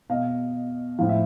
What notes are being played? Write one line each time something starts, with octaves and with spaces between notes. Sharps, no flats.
B2 D#5 F5
A2 F3 F5
E5